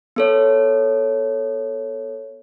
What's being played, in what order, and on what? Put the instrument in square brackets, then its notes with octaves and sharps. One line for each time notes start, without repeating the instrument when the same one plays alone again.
[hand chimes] B3 A4 C#5